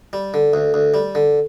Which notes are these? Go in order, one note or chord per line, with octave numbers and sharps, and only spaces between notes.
G3
D3
D2
D2
G3
D3